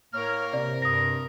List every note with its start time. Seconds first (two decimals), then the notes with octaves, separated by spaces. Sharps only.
0.14 A2 A#3 A#4 C#5 F6
0.53 C3 D5
0.82 G2 D#6 A#6